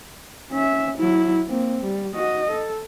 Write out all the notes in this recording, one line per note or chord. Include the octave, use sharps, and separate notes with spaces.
C#4 E5
F#3 E4
A#3 C4
G3
F#4 D#5
A4